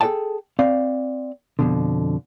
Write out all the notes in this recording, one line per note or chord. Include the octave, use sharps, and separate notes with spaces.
G#4 A4 B4 D#5 G5 A5
C4 D5 F5
F2 B2 D3